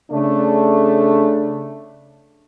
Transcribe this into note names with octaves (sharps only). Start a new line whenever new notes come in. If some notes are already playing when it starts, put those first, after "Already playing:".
C#3 A3 D4